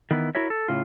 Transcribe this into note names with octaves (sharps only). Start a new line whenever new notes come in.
D#3 E3 B3 E4 B4
E4 F#4 A#4 C#5 E5
A4
A2 C#3 F4